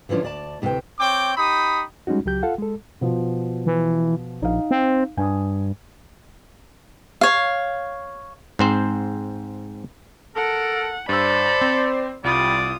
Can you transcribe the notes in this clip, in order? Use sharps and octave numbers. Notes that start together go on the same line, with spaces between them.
D3 E3 F3 C#4 D4
D2 D5 A5
D2 C3 E3 A3 G5
C4 C#5 G5 D6
D#4 G4 B5 D#6
G3 G#3 C#4 D#4 F#4
C#2 F#3 G4 G6
F4 A4 F5 F#5
G#3 A4
B2 F3
E3
A#1 D#4 F5
C4
G2 G#5 D#6
C#5 F5
G#2 C4 C5
A4 A#4 F#5
G2 A4 C5 D5 B5 E6
C4
C2 G3 F4 D5 D#6